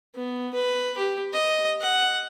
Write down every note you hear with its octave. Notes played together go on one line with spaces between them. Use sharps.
B3
B4
G4
D#5
F#5